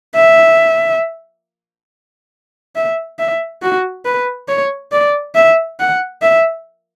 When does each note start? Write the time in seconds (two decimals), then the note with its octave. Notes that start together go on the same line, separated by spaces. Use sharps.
0.16 E5
2.76 E5
3.19 E5
3.62 F#4
4.06 B4
4.48 C#5
4.92 D5
5.35 E5
5.80 F#5
6.22 E5